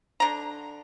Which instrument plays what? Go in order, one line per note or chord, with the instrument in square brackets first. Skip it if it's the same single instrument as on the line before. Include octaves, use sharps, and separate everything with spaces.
[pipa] D3 A#5